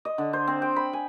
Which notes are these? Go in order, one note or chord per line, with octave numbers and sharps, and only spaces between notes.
D#5
D3
C5
C4
G5
B5
G#5